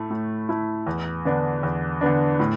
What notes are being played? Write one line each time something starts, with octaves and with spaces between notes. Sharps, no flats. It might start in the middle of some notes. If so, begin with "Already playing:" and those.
Already playing: A2 A3 E4
A2
A3 E4
E2
D3 B3 D4
E2
D3 B3 D4
A2